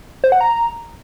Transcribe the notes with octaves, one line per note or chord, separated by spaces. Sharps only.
C5
F#5
A#5